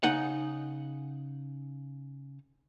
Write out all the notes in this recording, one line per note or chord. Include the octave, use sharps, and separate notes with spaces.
C#3 D#4 F#5